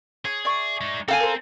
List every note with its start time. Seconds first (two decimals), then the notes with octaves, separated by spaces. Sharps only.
0.25 G#4 C#5
0.45 D5 E5 C#6
0.81 G#3 D#4
1.08 A#3 C4 A4 F5 G5 G#5
1.20 A#4 C5